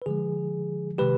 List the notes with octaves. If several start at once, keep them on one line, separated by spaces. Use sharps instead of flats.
B4
D3 F3 G#3 G#4
C3 D#3 G#3 G4 B4